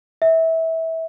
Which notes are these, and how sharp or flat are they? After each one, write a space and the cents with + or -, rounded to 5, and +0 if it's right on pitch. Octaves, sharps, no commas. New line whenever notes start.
E5 -20